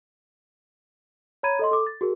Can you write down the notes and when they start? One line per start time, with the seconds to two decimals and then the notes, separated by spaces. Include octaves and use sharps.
1.43 C#5 A#5 B5 G#6 D#7
1.59 A4 D#5 C6
1.71 A4 D6
1.87 A6
2.01 F#4 G#4 A#4